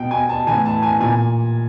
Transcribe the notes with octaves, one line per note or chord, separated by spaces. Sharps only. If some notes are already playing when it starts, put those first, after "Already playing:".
Already playing: B2 G5
G#5
A5
A2 E3 G#5
A5
G#5
A#2 G#5